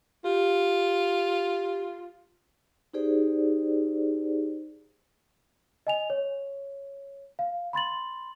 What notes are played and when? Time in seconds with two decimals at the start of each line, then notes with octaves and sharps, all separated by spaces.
0.24 F4 G4
2.93 D#4 G4 G#4 C5 D5
5.87 D#5 G#5 F7
6.10 C#5
7.39 F5
7.73 B5 C6 A6 F#7